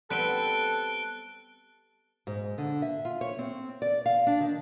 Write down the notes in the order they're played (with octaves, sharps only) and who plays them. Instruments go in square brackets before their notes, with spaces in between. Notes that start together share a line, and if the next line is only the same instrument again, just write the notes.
[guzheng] G3 B3 C4 [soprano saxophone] A4 [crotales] F#6 D7 G7
[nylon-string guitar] G#2
D3
E5
F4
C#5
C4
D5
F5
D4
D#3